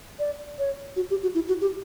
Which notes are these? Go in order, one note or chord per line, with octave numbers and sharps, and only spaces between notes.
D5
C#5
F#4
G4
F#4
E4
F#4
G4